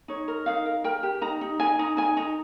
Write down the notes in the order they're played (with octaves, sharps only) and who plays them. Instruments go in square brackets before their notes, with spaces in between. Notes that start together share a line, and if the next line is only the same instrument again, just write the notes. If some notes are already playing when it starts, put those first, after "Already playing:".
[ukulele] D#4 C#5
A#4
D#4 F5
A#4
A#4 G5
G4
D#4 A#5
D#4
D#4 G#5
D#4 A#5
D#4 G#5
D#4 A#5